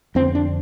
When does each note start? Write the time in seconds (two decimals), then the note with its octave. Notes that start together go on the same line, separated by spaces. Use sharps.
0.15 F2 C4
0.19 D3
0.35 D4